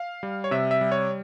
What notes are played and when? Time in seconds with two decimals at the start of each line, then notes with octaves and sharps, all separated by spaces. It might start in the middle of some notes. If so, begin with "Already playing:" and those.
Already playing: F5
0.23 G3
0.44 C#5
0.51 C3 E5
0.71 E5
0.81 G3
0.92 C#5